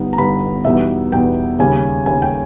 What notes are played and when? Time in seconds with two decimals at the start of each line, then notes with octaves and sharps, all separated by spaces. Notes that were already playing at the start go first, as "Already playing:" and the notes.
Already playing: G1 G2 G3 B3 D#4
0.13 A#5
0.18 G1 G2 G3 B3 D#4 B5
0.65 E2 B2 G3 B3 D#4 E5
1.12 E2 B2 G3 B3 D#4 G5
1.59 D#2 C#3 G3 G#5
2.06 D#2 C#3 G3 G#5
2.22 G5